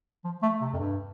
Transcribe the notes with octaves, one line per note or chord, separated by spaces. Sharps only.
F3
A3
C3
F2
G2